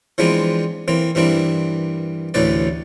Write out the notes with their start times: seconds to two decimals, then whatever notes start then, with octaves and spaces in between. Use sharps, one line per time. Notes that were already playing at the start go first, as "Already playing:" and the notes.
0.18 E3 F3 G#3 B3 C4 D4
0.88 E3 A#3 C4
1.15 G2 E3 A#3 C4 D4 E4
2.34 A1 D2 A2 E3 B4 D5